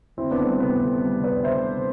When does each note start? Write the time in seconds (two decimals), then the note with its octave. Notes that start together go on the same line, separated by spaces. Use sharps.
0.17 D2 C4 E4
0.31 D2 B3 D4
0.45 G3 C4
0.60 C3 B3
0.74 D2
0.81 C4
0.88 D2
1.02 G3
1.16 C3
1.23 B4 D5
1.31 D2
1.44 D2 C5 E5
1.59 G3
1.73 C3